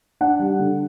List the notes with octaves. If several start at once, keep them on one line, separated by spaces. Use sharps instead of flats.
D4 F#5
G3
D3